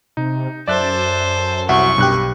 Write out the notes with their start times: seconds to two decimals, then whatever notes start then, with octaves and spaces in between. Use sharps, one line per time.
0.17 C3 D#4
0.68 F#2 A4 C5 D5 E5 F#6
1.69 C2 F#4 E5 C#6
1.98 B1 G2 G4 F#6